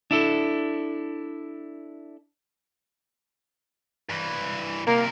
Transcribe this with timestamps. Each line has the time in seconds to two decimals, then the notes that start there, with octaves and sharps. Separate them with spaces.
0.11 D4 E4 A4
4.09 G2 E3
4.87 C3 A#3 A#4